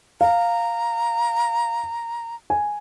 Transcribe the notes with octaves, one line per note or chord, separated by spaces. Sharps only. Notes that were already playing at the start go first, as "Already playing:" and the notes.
F5 A#5
G#5